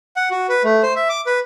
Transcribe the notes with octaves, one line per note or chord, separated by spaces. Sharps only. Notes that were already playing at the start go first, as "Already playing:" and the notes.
F#5
F#4
B4
A3
C5
E5
D6
B4